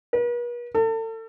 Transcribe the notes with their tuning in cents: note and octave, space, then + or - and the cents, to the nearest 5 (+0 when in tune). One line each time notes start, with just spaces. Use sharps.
B4 -45
A4 +35